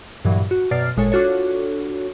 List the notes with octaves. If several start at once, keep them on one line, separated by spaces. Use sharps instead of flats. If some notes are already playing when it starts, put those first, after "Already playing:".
G2 A#2 E3 F#3
F#4
F#2 B2 D5 F6 A6 C7
G#1 A#2 G#3 A4 C#5
D4 F4 F#4 A4 C#5